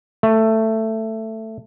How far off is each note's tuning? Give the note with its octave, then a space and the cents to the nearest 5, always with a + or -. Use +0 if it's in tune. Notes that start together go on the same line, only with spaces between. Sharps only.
A3 +10